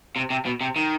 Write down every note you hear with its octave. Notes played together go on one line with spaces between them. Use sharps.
C3
C3
B2
C3
D#3